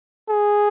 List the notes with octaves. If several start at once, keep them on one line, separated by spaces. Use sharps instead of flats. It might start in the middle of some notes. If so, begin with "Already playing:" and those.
G#4